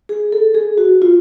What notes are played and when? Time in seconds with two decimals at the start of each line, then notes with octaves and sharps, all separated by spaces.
0.09 G#4
0.32 A4
0.55 G#4
0.78 F#4
1.02 F4